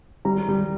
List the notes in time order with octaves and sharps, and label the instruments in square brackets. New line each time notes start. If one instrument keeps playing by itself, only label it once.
[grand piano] G3 A#5
G3